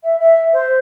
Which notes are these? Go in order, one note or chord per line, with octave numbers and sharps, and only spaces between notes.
E5
E5
C5